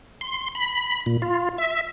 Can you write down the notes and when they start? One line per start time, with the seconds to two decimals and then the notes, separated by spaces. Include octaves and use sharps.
0.21 C6
0.55 B5
1.06 A#2
1.22 F4
1.58 E5